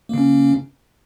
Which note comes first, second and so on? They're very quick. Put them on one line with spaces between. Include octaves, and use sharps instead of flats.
A#3 C#3 C#4